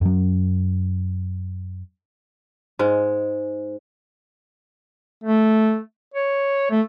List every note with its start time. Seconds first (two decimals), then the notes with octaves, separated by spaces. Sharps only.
0.01 F#2 F#3
2.79 G#2 G#3
5.24 A3
6.14 C#5
6.71 A3